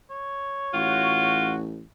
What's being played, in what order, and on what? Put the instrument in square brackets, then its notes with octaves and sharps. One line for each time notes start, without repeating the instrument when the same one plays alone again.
[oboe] C#5
[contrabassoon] A1 [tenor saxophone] F4 [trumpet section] F#4